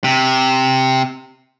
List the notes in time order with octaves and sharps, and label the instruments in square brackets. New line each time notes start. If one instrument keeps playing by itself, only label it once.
[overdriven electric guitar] C3